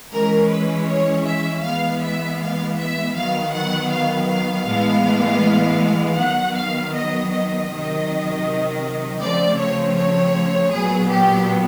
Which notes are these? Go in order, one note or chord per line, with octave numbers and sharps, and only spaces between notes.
E3 G#3 C#4 A#4
B4
C#5
E5
E3 G#3 B3 F5
E5
F5
E5
D#3 F#3 B3 F5
F#5
F5
F5
A2 E3 G#3 B3
D#3 F#3 B3 F#5
F5
D#5
D#5
C3 D#3 F#3
C#3 F3 A3 C4 D5
C#5
C#5
A#2 F#3 B3 G#4
G4